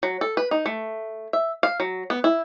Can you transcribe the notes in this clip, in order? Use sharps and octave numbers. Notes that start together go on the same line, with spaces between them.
F#3
A4
B4
D#4
A3
E5
F5
F#3
B3
E4